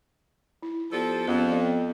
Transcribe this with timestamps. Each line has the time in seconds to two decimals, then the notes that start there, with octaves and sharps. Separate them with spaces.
0.63 E4
0.92 F3 B3 G4 A4 D5
1.28 F2 B3 C#4 G#4
1.49 D5